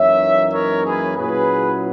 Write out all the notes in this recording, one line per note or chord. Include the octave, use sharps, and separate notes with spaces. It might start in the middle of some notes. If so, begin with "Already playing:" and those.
Already playing: F#2 E3 A#3 D#4 C#5 E5
A#4 C#5
G#4 B4
A#2 F#3 C#4 E4 G#4 B4